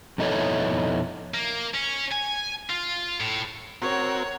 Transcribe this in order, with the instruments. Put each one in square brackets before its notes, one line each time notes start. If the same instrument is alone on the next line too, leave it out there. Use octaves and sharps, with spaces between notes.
[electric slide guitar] F2 B2 D#4 E4 A4 C#5
[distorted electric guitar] A#3
C#4
G#5
F4
A2
[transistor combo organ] C4 F#4 A#4 [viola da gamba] C#5